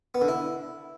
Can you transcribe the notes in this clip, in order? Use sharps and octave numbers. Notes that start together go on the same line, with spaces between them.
B3
D3
E4